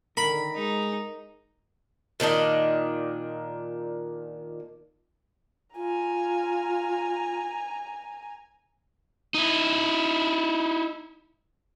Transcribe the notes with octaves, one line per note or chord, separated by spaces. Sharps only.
D3 D#3 A#4 B5
G#3 D#4
A#2 D#3 D4 D#5
F4 G#5 A#5
D#4 E4